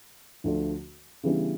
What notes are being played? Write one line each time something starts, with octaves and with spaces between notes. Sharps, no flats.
D2 D3 F3 A3 D4
C#3 E3 G3 B3 D4